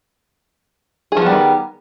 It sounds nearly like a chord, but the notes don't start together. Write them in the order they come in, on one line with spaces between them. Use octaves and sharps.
G#4 F3 B3 G3 D#3